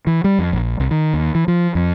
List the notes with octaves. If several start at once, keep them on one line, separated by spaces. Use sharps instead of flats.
E3
G3
F2
A#1
C2
D#3
D#2
E3
F3
F2